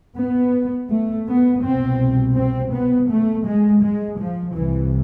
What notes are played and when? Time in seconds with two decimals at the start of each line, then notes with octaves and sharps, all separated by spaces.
0.18 B3
0.90 A3
1.28 B3
1.63 C2 B2 C4
2.36 C4
2.73 B3
3.10 A3
3.47 G#3
3.83 G#3
4.19 F3
4.55 C2 C3 E3